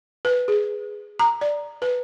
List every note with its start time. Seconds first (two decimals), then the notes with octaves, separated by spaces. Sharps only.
0.25 B4
0.48 G#4
1.19 A#5
1.41 D5
1.82 B4